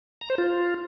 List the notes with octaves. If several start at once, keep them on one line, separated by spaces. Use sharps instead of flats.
A#5
C5
F4